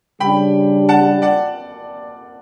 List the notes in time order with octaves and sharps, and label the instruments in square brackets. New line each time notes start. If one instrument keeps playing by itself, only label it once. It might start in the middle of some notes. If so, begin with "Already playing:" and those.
[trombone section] C#3 G3 D4 [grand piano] G5 B5
[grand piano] F#5 A5
D5 F#5